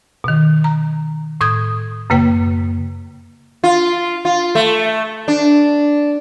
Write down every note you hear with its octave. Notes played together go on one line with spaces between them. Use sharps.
B2 D#3
A#5
A2 D#6 G6 G#6
F#2 C#3 A#3 B4 G5
F4
F4
A3
D4